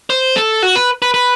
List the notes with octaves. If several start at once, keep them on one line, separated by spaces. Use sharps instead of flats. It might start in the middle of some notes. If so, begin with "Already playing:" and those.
C5
A4
F#4
B4
B4
B4